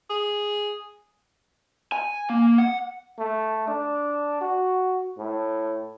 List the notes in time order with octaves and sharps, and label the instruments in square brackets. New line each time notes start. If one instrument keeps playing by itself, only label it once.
[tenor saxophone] G#4
[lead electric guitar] G#5
A#3
F#5
[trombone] A3
D4
F#4
A2